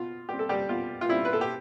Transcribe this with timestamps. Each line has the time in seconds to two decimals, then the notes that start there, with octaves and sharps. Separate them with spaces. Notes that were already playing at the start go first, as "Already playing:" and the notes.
Already playing: B2 F4
0.29 G3 C4 G4
0.39 A4
0.49 G3 G4
0.69 B2 F4
1.01 F4
1.09 G3 C4 E4
1.25 B4
1.33 A4
1.41 G4